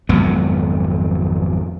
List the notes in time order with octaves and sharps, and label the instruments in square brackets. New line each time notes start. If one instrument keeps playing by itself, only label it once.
[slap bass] G#1 F2 F#3 B3